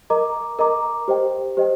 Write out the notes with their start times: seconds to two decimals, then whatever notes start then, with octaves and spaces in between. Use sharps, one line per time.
0.10 A#4 D#5 A#5 D6
0.59 A#4 D#5 A#5 D6
1.08 G4 C5 D#5 G5
1.57 G4 C5 D#5 G5